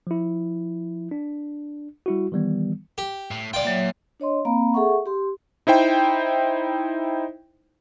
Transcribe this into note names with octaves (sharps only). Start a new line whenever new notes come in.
F3 E4
D4
G3 E4 F#4
D#3 E3 G3 B3
G4
A2
C3 F4 D5 G5
A#2 F#3 C#5 E5
D4 C#5 D#5 C6
A#3 C4 F5 A#5 B5
G#4 A4 E5 F#5 C#6
G4 C6
D#4 E4 C5 G5